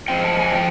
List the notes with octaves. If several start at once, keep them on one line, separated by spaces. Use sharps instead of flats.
F3 G#3 C4 F4 G5
A5
G#5
F3 G5